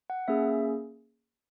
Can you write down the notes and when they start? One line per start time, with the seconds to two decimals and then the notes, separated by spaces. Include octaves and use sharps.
0.10 F#5
0.28 A#3 C#4 G#4 E5